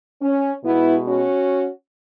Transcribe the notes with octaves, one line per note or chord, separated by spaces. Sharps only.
C#4
B2 G#3 B3 E4
C#4 F#4